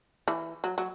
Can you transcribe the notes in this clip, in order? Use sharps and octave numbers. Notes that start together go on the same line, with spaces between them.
E3
F#3
F#3